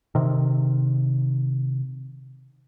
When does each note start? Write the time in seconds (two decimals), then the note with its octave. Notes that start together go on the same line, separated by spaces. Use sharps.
0.15 C3 D#3